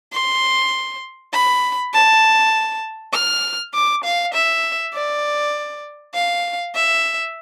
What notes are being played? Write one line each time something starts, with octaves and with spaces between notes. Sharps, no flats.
C6
B5
A5
F6
D6
F5
E5
D5
F5
E5